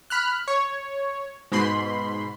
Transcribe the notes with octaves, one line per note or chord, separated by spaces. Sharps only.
B5 F6 F#6
C#5
G#2 B2 B5 C6